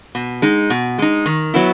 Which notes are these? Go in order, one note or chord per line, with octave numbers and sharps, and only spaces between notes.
B2
G#3 D#4
B2
G#3 D#4
D#3
F#3 B3 E4